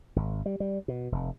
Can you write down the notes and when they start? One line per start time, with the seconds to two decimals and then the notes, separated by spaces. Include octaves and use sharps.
0.16 G#1
0.46 G3
0.60 G3
0.88 B2
1.12 F1